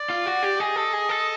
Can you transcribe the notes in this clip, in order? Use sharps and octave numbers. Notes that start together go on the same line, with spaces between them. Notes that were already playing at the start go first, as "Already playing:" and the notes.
Already playing: D5
F4
F#4
G4
G#4 D#5
A4
G#4
A4